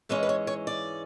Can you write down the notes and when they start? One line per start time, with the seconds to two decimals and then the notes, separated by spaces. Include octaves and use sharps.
0.09 G#2 E3 G#3 C#4 B4
0.23 B4
0.29 C#5
0.47 C#5
0.67 D5